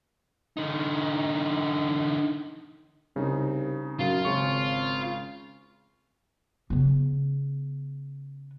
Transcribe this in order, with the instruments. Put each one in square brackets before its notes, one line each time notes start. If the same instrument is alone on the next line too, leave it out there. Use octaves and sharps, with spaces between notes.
[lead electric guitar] D3 D#4
[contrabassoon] C2 [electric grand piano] C#3 D#4
[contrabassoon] F#2 [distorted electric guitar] F4
[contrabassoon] G#1 [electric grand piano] C#3 C#6
[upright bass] C#3 B3